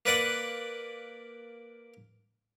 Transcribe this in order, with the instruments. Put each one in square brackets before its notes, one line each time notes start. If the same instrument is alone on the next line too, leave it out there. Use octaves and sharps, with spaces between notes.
[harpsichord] A#3 B4 D5 F#5